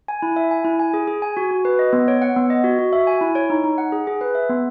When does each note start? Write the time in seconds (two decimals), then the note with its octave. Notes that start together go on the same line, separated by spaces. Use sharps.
0.08 G#5
0.22 E4
0.36 E5
0.51 G#5
0.65 E4
0.79 G#5
0.94 G#4
1.07 G#4
1.22 G#5
1.37 F#4
1.51 F#4
1.65 B4
1.79 D#5
1.93 B3
2.08 C#5
2.22 F#5
2.36 B3
2.50 D#5
2.64 F#4
2.79 F#4
2.93 E5
3.07 G#5
3.21 E4
3.35 C#5
3.50 D#4
3.64 D#4
3.78 F#5
3.92 G#4
4.07 G#4
4.21 B4
4.35 E5
4.49 B3